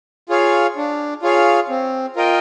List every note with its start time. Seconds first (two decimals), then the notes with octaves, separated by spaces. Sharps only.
0.29 F4 G#4 C#5 F5
0.77 D4
1.22 F4 G#4 C#5 F5
1.69 C4
2.16 F4 A#4 D#5 G5